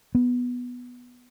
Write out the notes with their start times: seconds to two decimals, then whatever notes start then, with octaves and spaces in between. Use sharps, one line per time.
0.15 B3